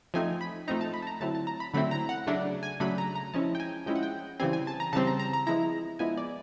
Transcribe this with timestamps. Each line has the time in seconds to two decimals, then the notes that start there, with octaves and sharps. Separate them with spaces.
0.14 F3 A3 C4 D#4 G#5
0.41 B5
0.68 F3 A3 C4 D#4 A#5
0.81 A5
0.94 B5
1.02 A5
1.07 A#5
1.20 D3 F#3 A3 C4 E4 A5
1.35 A5
1.47 A#5
1.60 B5
1.74 D3 F#3 A3 C4 E4 B5
1.91 A#5
2.09 F#5
2.27 C#3 F#3 A3 D4
2.63 G#5
2.80 C#3 F#3 A3 D4 B5
2.98 A#5
3.15 A#5
3.34 F3 G#3 C#4 E4 A5
3.55 G5
3.60 G#5
3.86 F3 G#3 C#4 E4 G5
3.96 F#5
4.03 G5
4.40 C#3 E3 G3 C4 G#5
4.53 G#5
4.67 A5
4.80 A#5
4.93 C#3 E3 G3 C4 A5
5.07 A#5
5.19 A#5
5.33 A#5
5.47 F3 G#3 B3 E4 A#5
5.99 F3 G#3 B3 E4 G#5
6.17 D5